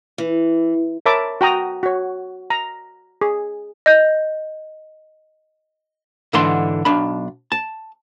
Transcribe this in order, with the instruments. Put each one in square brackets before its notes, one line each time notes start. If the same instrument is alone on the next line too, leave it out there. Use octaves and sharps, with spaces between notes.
[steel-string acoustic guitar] E3
[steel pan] A#4 C#5 E5 A5 B5 D6
F#4 G5 A#5 D#6
F#4 C#5
A#5
G#4
[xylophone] D#5 G6
[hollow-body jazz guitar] G#2 D3 E3 D4 C6
B1 D4 B5
A5